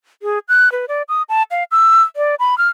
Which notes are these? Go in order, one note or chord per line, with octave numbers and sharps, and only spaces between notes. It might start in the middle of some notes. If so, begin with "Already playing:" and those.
G#4
F#6
B4
D5
D#6
A5
F5
E6
D5
B5
F6